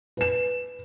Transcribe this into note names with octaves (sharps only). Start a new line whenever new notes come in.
B4 E7